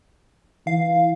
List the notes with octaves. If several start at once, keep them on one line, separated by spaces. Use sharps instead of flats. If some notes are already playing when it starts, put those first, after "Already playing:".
E3 F5